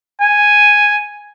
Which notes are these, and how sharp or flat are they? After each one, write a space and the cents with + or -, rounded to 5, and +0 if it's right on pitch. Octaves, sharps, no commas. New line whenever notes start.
G#5 -5